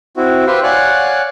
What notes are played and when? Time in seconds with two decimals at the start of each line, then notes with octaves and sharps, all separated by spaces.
0.17 C4 E4 F#4
0.47 G4 B4 C5 E5 F5 G5
0.63 C#5 D5 F5 F#5 G#5 F#6